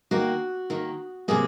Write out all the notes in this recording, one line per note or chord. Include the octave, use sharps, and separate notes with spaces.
D#3 A#3 F#4
D#3 A#3
C3 F#3 A#3 G#4